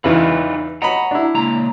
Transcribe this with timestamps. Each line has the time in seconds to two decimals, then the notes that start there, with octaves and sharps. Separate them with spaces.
0.04 E2 C#3 E3 D#4 F4 B4
0.82 D#5 F#5 A#5 B5
1.11 D4 E4
1.35 C#2 A#2 A#5